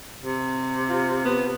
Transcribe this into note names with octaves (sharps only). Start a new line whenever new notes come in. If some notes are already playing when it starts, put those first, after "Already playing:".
C3
F4
B3